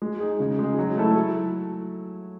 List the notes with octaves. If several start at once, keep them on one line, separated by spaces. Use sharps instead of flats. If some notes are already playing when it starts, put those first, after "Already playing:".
G#3
D#4 G#4
C#3
G#3 D#4 G#4
F#3
A3 E4 A4
F#3